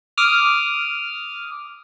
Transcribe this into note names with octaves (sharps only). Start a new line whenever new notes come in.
D6 D#6 F6